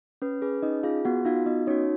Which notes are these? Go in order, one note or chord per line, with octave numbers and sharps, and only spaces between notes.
C#4 B4
G#4 B4
C#4 D#4 D#5
F4 G#4 F5
B3 F#4 F#5
D#4 F4 F#4 F5
B3 D#4 D#5
C#4 D#4 F#4 C#5